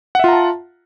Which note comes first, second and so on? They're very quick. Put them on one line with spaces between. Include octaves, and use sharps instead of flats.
F#5 E5 F4 A#5 A5